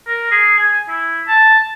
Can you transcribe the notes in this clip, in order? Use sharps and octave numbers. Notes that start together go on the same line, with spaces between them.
A#4
G#4
G#5
E4
A5